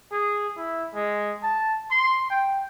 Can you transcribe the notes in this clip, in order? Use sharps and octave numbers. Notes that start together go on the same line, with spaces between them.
G#4
E4
G#3
A5
C6
G5